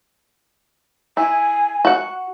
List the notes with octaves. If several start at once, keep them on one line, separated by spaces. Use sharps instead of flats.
E4 G#5
F#4 F#5